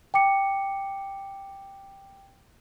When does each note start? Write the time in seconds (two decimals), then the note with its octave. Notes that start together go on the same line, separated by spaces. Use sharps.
0.14 G5 D6 C#7